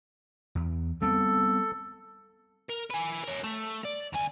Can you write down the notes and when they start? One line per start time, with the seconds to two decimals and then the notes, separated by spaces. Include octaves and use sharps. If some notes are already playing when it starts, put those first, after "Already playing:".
0.55 E2
1.02 G3 B3 C4 A4
2.69 A#4
2.90 B4 G#5
3.24 A#4 C#5
3.44 A3
3.84 D5
4.13 D2 G#5